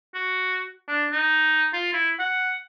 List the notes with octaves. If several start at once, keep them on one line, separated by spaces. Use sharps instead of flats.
F#4
D4
D#4
F4
E4
F#5